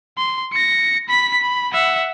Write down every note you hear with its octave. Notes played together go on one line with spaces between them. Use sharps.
C6
A#6 C#7
B5 B6
B5
E5 F#5